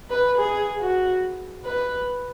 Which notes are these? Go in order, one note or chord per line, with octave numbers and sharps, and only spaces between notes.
B4
G#4
F#4
B4